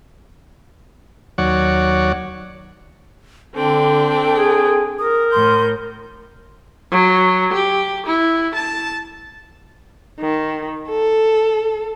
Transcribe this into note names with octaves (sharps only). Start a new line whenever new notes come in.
D#2 F#3 C#5 D5 F#5
D3 C4 D4 A4 G5
G#4
A#4 D#6
A2 C6 G6
F#3
G4
E4
A5
D#3
A4